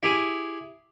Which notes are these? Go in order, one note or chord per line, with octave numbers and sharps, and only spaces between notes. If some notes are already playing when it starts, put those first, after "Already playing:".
E4 G4 G#4